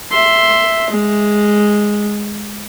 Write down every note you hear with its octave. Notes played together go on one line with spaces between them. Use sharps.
E5 C6
G#3